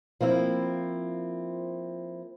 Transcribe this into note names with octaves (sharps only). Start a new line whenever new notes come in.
F3 A#3 C4 E4